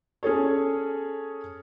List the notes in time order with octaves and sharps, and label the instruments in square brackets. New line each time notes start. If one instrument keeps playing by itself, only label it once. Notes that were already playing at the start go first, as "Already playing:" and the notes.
[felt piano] C#4 G#4 A4 C#5